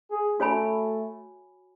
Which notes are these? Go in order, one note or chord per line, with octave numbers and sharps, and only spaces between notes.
G#4
A3 F#4 C#5 G#5 B5